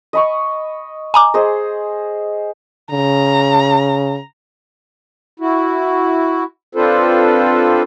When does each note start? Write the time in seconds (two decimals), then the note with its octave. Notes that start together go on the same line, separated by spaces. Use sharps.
0.13 D#5 B5 C#6
1.14 G#5 A#5 D6
1.34 G#4 C5 D#5
2.91 C#3 A#5
5.40 E4 F#4
6.75 C4 D4 F4 A4 B4 C5